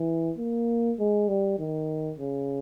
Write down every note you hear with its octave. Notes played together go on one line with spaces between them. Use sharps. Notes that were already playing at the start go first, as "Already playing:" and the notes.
Already playing: E3
A#3
G#3
G3
D#3
C#3